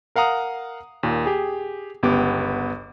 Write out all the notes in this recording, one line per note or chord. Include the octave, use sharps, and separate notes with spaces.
A#4 F5 F#5 A#5 D#6
D#2 A#2
G4 G#4
G1 C#2 B3 G4 D6